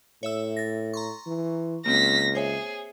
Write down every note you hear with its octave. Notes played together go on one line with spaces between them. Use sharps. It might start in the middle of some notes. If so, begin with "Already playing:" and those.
A2 C#5 E5 E6
A6 A#6
A#5 C6 C#6
E3
C#2 A#3 C4 A#6 B6
G#4 C5 C#5 E5